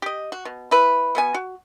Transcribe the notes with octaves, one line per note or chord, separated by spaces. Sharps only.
G4 D#5
F#4
B2
E4 B4
B2 B3 G#5
F#4